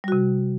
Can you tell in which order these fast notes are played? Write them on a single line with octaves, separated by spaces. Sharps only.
G3 F#4 C3